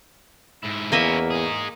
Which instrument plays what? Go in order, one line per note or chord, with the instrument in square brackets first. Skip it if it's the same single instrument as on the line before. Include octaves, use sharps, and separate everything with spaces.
[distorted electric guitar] G#2 E4
[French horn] E2 [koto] A#3 D#5 E5 [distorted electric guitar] C#4 E4
[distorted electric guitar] D#4 G#4